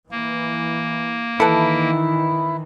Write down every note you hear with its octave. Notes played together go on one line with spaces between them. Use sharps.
E3 A#3
D#3 E3 E4 A4 B4